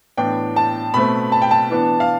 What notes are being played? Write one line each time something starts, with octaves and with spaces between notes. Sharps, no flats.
A2 E3 B3 D4 G5
A5
B2 A3 C4 B5
A5
G5
A5
E3 B3 D4
F5